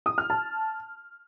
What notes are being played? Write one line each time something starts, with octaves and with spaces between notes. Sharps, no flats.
D#6
F6
A5